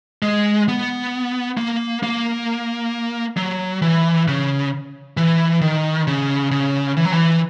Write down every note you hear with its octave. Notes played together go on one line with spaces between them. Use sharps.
G#3
B3
A#3
A#3
F#3
E3
C#3
E3
D#3
C#3
C#3
E3
F#3
E3